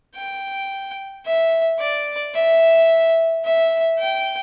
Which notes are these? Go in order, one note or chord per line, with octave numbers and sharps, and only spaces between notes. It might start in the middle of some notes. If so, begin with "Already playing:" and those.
G5
E5
D5
E5
E5
G5